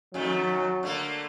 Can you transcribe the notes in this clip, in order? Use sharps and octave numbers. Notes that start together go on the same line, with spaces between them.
F2 D#3 F#3 A3
D3 A3 A#3